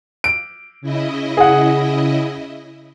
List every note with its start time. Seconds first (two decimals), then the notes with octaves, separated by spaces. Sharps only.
0.24 D7
0.81 C#3 E4 D#5
1.37 G#4 F#5